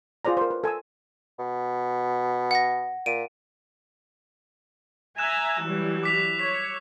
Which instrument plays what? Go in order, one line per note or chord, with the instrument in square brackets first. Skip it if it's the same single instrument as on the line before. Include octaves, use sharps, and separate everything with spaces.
[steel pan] F4 G#4 C5 D5 A#5
A#4 C5
B4
A4 G#5 C6 E6
[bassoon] B2
[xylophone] F#5 A#6
[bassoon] A#2 [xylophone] D7 D#7
[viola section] E5 G#5 A#5 [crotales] E6 F#6 E7
[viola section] E3 F#3 G3
[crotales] D6 B6 F7
[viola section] C#5 [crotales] B6